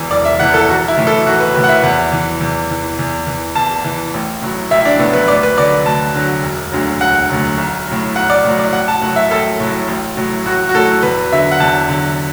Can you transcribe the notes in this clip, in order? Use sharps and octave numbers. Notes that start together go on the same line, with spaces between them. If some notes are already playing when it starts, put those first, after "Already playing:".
Already playing: E1 E2 E3
E1 D5
E5
E2 E3 F#5
A4
B1 F#4
E4
A2 E3
A4
B1 F#4
B4
A2 E3 B4
F#5
E5
E2 F#5
E3
E2
E3
E2
E3
E2 A5
E3
A1
A2 F#3
A1 E5
E4
D4
A2 F#3 B3
B4
D2 D5
B4
D3 F#3 D5
D2 A5
D3 F#3
E1
D2 D3 F#3
E1 F#5
D2 D3 F#3
B1
F#3
A2
B1 F#5
D5
A2 F#3
D5
A1 F#5
A5
A2 F#3 F#5
E5
A1 A4
A2 F#3
A1
A2 F#3
A1 F#4
F#4
A2 F#3 A4
E2 B4
D3 F#3 E5
F#5
E2 A5
D3 F#3